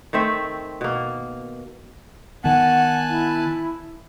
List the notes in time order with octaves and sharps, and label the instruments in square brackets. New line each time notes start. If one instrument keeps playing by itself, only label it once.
[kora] D#3 A3 C4 E5
B2 A#3
[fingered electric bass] D#3 B3 [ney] F#5 [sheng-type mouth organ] G#5 A5 F#6
[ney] E4